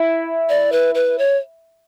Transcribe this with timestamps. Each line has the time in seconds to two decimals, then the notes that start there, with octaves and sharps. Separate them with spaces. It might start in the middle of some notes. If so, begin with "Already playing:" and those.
Already playing: E4
0.49 D5
0.72 B4
0.95 B4
1.18 C#5